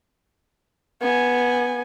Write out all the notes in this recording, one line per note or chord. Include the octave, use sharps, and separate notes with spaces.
B3 G#5